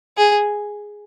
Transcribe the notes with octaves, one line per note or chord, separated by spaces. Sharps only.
G#4